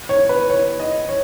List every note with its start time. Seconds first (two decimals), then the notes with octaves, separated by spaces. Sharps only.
0.09 C#5
0.29 B4
0.50 C#5
0.80 D#5
1.09 C#5